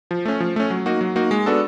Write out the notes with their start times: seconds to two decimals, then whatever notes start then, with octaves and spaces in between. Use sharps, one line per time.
0.11 F3
0.25 A3 C#4
0.40 F3
0.56 A3 C#4
0.70 F#3
0.86 A#3 D#4 F#4
1.01 F#3
1.16 A#3 D#4 F#4
1.31 G#3
1.46 B3 D4 F#4 A4